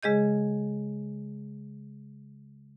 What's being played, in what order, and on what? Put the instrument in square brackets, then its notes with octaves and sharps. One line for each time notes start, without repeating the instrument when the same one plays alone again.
[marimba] C#3 G#3 G#4 D#5 G6